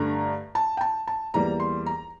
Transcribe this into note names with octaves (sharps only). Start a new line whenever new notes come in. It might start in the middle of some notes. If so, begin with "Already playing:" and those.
Already playing: G2 D3 A3 A#5
A5
G5
A5
A5
E2 E3 G3 A#3 A#5
C6
A#5